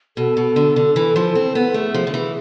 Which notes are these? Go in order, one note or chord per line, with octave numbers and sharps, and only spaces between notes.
B2 A4
B2
D3
D3
E3
F3
C4
B3
A3 G#4
F3
D3
E3